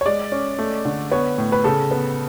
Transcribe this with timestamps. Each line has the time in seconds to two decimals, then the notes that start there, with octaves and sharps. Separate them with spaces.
0.01 C#5
0.06 G#3 D5
0.32 C#4
0.59 A3
0.85 D3
1.11 B3 C#5
1.38 A2
1.52 B4
1.64 C#3 A4
1.91 B3